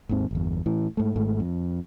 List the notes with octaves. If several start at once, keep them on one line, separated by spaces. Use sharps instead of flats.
G#1 D#2 G#2 C4
G1 E2
A2 E3
G#2 A3
G#1 G#2 A3
F2